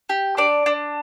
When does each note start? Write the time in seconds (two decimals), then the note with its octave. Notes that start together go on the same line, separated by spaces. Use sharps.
0.09 G4
0.37 D4 D5
0.66 D4